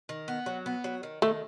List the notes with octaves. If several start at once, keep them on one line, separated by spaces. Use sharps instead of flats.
D#3
B3
F#3
B3
F#3
D#3
D#3 A3